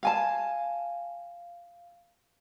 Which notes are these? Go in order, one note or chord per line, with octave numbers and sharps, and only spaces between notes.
F5 G#5 A5